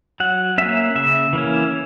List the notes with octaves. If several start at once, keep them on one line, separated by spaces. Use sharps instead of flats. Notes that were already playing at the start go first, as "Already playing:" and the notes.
F#3 F#5
A#3 C#4 E5
C#3 E5
E3 A#3 C#4